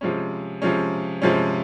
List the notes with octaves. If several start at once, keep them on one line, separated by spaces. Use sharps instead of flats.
C3 F3 G#3 C#4
C3 F3 G#3 C#4
C3 F3 G#3 C#4